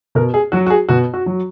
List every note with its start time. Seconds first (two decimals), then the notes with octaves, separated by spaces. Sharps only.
0.15 B2 A#4
0.34 G#4
0.52 F#3 F#4
0.67 F#4
0.70 G#4
0.89 B2 F#4
1.14 F#4
1.26 F#3